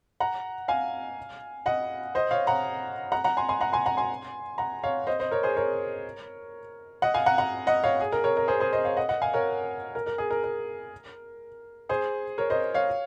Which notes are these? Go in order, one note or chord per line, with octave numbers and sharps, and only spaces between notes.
F#5 A#5
F5 G#5
D#5 F#5
C5 D#5
C#5 F5
F#5 A#5
F#5 A#5
F#5 A#5
G#5 C6
G#5 C6
F#5 A#5
G#5 C6
F#5 A#5
G#5 C6
F#5 A#5
C#5 F5
C5 D#5
C5 D#5
A#4 C#5
G#4 C5
A#4 C#5
D#5 F#5
F5 G#5
F#5 A#5
F#5 A#5
D#5 F#5
C#5 F5
G#4
A#4
A#4 C#5
A#4
G#4 C5
G#4 C5
C5 D#5
C#5 F5
D#5 F#5
D#5 F#5
F5 G#5
A#4 C#5
A#4
A#4
G#4
A#4
A#4
G#4 C5
A#4 C#5
C5 D#5
C#5 F5